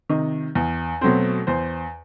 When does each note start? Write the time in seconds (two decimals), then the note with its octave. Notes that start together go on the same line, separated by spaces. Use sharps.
0.10 C3 D#3 D#5
0.55 E2
1.01 B2 F#3 A3 C4 C5
1.47 E2 C5